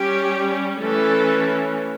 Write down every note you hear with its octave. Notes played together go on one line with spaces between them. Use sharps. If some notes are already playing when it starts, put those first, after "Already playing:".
Already playing: G3 C#4 G4
E3 A3 C#4 A4